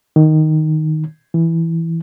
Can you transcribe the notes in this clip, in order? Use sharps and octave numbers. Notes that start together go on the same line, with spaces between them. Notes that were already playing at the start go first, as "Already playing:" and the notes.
D#3
E3